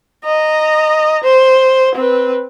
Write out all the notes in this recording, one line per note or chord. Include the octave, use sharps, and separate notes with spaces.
D#5 A#5
C5
C4 B4